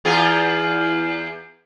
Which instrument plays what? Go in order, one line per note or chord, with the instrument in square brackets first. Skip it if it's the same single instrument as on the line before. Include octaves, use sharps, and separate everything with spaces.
[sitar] E2 F4 G#4